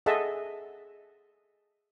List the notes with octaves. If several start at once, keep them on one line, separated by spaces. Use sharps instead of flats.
G#4 A4 D#5 E5 F#5 A5